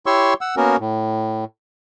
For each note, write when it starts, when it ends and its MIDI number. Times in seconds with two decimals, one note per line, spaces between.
0.06 0.34 64
0.06 0.34 67
0.06 0.34 73
0.06 0.34 84
0.06 0.34 85
0.06 0.34 88
0.41 0.55 78
0.41 0.55 88
0.57 0.77 58
0.57 0.77 59
0.57 0.77 61
0.57 0.77 66
0.57 0.77 70
0.80 1.45 45